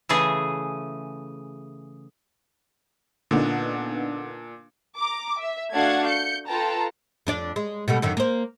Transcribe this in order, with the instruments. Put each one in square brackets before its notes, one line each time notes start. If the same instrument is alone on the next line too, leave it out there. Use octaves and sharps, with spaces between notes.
[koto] C#3 E3 A3 G#4
[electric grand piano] A#2 D4 [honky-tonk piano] D3 B3 D#4
[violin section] A#5 D6
E5
A3 D4 F#4 F5 F#5 G#6
G6 C#7
F4 A4 B4 G5 A5 A#5
[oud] F2 D4 D5
G#3
B2 G3 A3
F#2 D3 D#3
A#3 C5